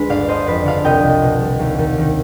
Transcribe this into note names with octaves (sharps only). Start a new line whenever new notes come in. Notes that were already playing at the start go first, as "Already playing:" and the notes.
Already playing: D2 D3 G#3 B3 B4
G1 D5 F5
G1 C5 D#5
F2 B4 D5
D3 D5 F5
C2 D#5 G5
C2
B2
G3
D#2
D#2
D#3